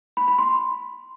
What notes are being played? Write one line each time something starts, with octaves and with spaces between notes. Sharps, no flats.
B5
B5
C6